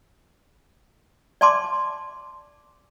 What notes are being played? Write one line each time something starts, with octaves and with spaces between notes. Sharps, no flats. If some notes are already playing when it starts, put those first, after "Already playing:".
D5 G#5 A5 C6 D6